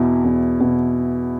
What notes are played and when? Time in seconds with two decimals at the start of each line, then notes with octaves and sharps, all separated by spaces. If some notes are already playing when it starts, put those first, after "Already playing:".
Already playing: E2 B2 E4
0.24 E2
0.60 B2